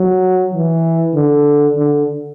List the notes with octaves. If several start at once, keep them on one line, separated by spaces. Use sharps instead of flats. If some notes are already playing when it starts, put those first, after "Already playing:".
Already playing: F#3
E3
D3
D3